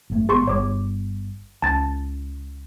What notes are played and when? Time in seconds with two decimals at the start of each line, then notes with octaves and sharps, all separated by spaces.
0.10 F#1 C3 A3
0.29 G#1 B3 G#4 C6 C#6
0.47 G1 C#5 D6
1.62 C#2 A5 A6